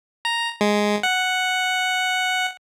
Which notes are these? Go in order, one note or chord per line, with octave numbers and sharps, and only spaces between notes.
A#5
G#3
F#5